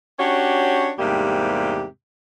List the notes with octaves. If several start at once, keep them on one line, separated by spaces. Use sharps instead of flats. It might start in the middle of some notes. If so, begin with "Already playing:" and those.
C#4 D4 F#4 G4 C#5
E2 G#2 C3 G3 A#3 G4